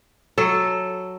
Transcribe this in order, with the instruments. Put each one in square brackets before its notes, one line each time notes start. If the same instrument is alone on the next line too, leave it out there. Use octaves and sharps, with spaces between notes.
[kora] F#3 A4